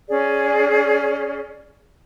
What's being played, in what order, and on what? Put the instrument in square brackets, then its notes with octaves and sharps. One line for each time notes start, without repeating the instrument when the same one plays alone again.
[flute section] C#4 G#4 D5